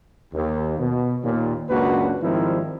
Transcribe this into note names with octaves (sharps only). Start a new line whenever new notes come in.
D#2
B2
D#2 A#2
C#2 F#2 A#3 D4 F#4 B4
G#2 D#3 F3 G3 C4 E4